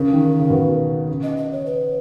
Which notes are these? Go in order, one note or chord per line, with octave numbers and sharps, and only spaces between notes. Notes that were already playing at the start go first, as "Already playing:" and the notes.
Already playing: C#3 A#4
D#3
C#3
B2
C#3
D#5
D#5
C#5
B4